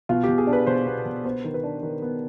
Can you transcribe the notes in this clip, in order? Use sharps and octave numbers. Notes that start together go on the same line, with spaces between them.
B2 F4
G4
B2
G#4
D4
B4
B2 C5
B3
B2
B3 C5
D#3
B4
D4
D#3
B3